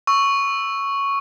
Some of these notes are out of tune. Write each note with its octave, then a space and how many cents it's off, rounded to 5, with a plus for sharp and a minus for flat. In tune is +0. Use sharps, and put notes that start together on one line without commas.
C#6 +0 E6 +0